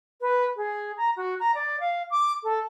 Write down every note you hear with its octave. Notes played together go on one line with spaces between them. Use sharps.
B4
G#4
A#5
F#4
A#5
D5
F5
D6
A4